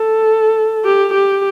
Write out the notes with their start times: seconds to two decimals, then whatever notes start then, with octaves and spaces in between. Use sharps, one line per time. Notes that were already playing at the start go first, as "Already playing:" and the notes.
Already playing: A4
0.85 G4
1.14 G4